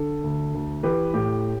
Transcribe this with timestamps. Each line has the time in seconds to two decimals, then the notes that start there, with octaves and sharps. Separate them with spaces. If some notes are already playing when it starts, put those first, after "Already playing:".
Already playing: D3 A4
0.23 D2
0.54 D2
0.83 E3 G4 B4
1.14 A2 G4